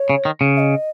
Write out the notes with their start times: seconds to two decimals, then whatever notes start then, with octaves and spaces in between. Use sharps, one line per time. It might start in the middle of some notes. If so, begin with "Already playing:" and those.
Already playing: C#5
0.10 C#3
0.25 D#3
0.41 C#3
0.56 E5
0.60 D#5